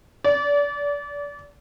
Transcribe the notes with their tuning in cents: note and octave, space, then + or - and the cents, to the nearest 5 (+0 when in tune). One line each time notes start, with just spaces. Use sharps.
D5 -30